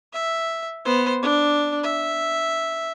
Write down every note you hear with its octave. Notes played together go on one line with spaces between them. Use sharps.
E5
B3 C5
D4
E5